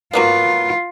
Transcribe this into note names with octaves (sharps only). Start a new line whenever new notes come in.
F#3 A#3 B3 F4